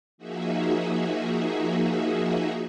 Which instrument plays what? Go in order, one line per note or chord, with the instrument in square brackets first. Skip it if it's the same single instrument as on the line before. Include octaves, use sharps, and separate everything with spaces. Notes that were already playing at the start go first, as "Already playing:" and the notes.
[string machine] F3 A#3 D#4 F#4 G#4 E5